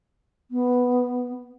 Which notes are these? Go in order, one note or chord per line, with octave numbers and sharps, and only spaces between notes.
B3